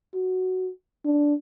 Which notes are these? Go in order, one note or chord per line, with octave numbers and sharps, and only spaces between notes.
F#4
D4